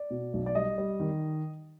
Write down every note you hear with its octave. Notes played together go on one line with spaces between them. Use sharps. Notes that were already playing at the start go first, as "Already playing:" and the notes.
Already playing: D5
B2
B1
D5
G3 D#5
G3
D#3